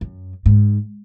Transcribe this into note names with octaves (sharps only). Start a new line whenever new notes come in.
F#2
G#2